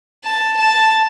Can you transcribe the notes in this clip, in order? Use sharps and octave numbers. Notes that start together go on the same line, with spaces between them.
A5
A5